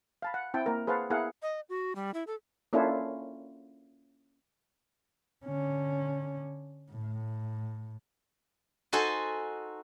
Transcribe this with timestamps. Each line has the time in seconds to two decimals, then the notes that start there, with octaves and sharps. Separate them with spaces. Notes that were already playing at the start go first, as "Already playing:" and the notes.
0.22 F5 A5 B5
0.34 F#5
0.54 C4 E4 G5 A5
0.66 A#3 A#4
0.87 G#4 B4 C5 F5 F#5 A5
1.10 B3 E4 G#4 A#4 F5 F#5
1.42 D#5
1.69 F#4
1.96 G3
2.14 E4
2.27 A4
2.73 A#3 C#4 D4 E4 F4 A4
5.45 D3 C#4
6.90 A2
8.93 D#4 F#4 A4 C5 G#5